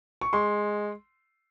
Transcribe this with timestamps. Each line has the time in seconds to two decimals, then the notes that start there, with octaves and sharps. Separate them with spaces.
0.21 C#6
0.33 G#3 C6